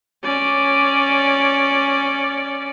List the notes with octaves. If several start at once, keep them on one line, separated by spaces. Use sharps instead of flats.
C#4 D5